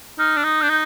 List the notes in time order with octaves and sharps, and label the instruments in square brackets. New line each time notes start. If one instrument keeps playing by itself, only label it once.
[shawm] D#4 [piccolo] F6
[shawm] D4
[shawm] D#4 [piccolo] D#6
[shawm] D4 [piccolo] G6
[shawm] D#4